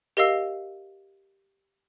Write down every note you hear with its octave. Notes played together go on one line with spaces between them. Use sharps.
G4 A#4 D#5 F5 E6 C7